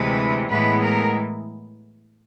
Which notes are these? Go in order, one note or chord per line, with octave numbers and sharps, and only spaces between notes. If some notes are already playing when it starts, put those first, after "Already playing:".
Already playing: D2 C3 E3 G#3 B4
A2 E3 G#3 B3 B4
A#4